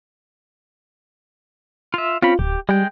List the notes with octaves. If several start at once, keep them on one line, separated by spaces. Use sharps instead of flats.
F4 E5
C4 C#4 F4 B5
D1 G4
G3 G#3 G5